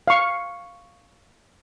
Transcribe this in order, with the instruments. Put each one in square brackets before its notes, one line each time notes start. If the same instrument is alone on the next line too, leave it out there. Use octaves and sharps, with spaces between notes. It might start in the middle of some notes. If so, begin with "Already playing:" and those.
[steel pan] F5 C#6